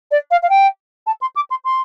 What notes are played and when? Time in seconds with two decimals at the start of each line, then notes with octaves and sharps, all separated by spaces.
0.11 D5
0.31 F5
0.42 F5
0.49 G5
1.06 A5
1.21 C6
1.35 D6
1.50 C6
1.64 C6